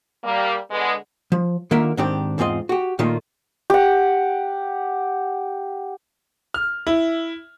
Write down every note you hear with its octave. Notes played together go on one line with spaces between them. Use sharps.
G3 A#3
D3 G#3 B3
F3
D3 D#3 A#3 F4 A#4 E5
G#2 D#3 C4 D4 G4
E2 G#2 C4 F4 D#5
F#4 G4
A#2 D#3 A3 A#3 D#4 F4
G4 F#5
F6
E4